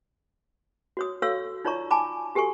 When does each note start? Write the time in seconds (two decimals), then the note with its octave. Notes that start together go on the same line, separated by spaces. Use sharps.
0.97 F#4 C#5 D#6
1.22 F#4 A4 C#5 F5 C#6 E6
1.65 D#4 F4 C#5 D5 A#5 C#6
1.90 G#5 A5 B5 D6
2.35 F#4 G4 A4 G#5 C#6